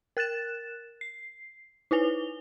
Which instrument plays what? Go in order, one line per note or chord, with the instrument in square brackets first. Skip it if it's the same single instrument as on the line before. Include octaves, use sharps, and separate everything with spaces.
[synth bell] A#4 F#6 A6 E7
C7
D#4 E4 B4 F7 G7